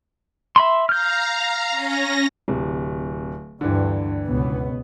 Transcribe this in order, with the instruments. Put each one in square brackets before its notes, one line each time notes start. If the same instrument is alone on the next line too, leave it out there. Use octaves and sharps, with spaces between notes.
[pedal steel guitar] E5 B5 C6
[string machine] F5 A#5 [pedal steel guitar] F6 G6
[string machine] C#4 A#6
[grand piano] D1 C3
[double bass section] D2 G2 [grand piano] D3 E3
[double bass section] C#2 B2 B3